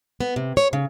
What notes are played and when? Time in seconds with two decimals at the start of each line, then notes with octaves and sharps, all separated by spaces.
0.20 B3
0.36 C3
0.57 C#5
0.73 C#3